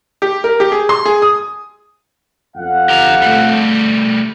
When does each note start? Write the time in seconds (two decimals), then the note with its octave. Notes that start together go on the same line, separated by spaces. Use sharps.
0.22 G4
0.44 A#4
0.60 G4
0.72 G#4
0.89 C6
1.06 G#4
1.22 D#6
2.56 F2 F5 F#5
2.90 G4 A#5
3.22 G3 A3